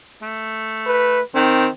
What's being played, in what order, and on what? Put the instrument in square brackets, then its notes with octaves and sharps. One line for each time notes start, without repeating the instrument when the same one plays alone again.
[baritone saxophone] A3
[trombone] B4
[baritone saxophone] D#3 [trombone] C4